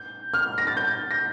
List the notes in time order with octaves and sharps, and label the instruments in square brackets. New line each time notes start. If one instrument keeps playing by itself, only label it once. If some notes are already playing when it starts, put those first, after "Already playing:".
Already playing: [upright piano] G6
F6
A#6
A6
G6
A#6